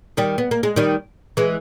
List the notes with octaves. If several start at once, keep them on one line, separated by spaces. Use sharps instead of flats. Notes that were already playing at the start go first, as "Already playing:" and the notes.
D#3 G3
B3
A#3
G#3
D#3 G3
E3 G#3